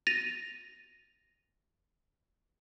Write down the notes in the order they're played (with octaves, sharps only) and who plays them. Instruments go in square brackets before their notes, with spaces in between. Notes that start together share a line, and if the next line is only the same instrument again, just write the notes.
[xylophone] A6 A#6 D#7 F7